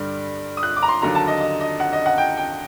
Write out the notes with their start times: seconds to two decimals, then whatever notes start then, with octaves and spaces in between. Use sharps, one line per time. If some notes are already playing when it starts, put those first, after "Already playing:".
Already playing: G2 D3 G3
0.57 D#6
0.63 F#6
0.76 D6
0.83 A#5
0.88 C6
1.02 D#2 D3 F#3 A#5
1.15 A5
1.28 D#5
1.40 D#5
1.60 D#5
1.80 F#5
1.93 D#5
2.06 F#5
2.18 G5
2.37 G5